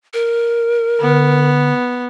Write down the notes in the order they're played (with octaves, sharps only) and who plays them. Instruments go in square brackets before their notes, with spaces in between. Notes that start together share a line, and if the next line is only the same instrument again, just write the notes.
[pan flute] A#4
[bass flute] D3 [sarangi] B3